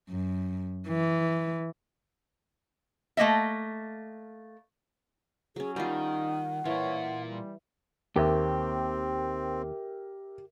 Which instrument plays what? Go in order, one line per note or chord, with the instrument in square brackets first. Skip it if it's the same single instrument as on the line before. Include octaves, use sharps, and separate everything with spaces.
[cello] F#2
E3
[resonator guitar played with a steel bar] A3 A#3 D#5 E5
[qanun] F#3 C#4 [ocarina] G#4
[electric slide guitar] D#3 [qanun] G3 F4 [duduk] D#4 [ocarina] F#5
[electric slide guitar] A#2 F4 [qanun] E3 [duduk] C#5
[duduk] G3
[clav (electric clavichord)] D#2 [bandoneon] C4 [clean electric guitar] G4 [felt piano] A#4 E5